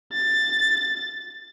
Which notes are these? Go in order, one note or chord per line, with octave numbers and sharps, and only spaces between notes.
A6